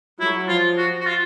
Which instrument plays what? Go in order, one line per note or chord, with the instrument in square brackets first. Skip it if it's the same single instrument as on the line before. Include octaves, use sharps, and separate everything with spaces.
[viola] F#3 [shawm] E4
[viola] F3 [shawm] F4
[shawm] F#4
F#4
F4